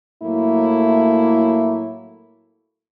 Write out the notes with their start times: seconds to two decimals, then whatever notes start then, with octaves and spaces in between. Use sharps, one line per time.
0.23 A2 F#3 A3 A#3 E4